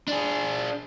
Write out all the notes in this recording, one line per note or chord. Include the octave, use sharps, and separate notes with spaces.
D4 G#4